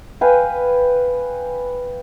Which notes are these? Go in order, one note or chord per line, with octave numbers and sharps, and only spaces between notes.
B4 F5 G5 G#5